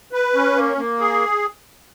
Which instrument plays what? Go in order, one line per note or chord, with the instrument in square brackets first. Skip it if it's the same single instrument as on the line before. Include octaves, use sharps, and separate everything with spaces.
[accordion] B4
C#4
A#3
A#3
G#4